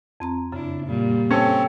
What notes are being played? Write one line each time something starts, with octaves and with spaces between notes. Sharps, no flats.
F2 C4 A#5
F#2 C#3 D4 E4
A#2 G3
C4 C#4 A4 C#5